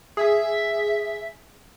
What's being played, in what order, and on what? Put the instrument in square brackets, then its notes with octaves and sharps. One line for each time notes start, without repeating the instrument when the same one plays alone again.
[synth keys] G#4 [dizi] E5